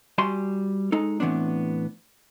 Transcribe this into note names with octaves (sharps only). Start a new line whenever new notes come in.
G3 F#4 G#5 C6
G#3 D#4 A4
A2 E3 B3 C4 D4